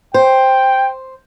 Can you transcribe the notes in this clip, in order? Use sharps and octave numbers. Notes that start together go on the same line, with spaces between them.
C5 G5